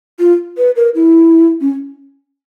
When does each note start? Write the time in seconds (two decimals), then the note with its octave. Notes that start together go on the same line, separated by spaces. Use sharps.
0.19 F4
0.58 B4
0.76 A#4
0.95 E4
1.61 C#4